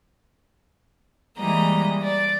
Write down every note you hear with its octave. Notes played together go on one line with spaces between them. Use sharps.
E3 G3 G#3 A#3 D#5 A#5
D5